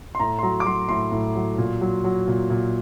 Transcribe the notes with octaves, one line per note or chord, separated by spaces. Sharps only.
C6
A2 A#5
C6
F#3 A#5
D6
F#3 C6
A2 C6
A2
F#3
A#2
F#3
F#3
A#2
A#2